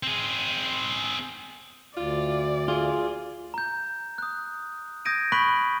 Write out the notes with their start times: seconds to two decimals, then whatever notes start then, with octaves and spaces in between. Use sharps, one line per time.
0.03 C4 G#4
1.97 D2 F4 D5
2.68 F4 G#4
3.54 A#5 G6
4.18 D#6 F#6
5.05 D#6 G6 G#6 A#6 D7 D#7
5.32 B5 C#6 F#6 B6 D7 F#7